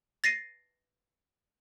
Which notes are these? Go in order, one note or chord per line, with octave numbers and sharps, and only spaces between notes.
A6 A#6 C7 D#7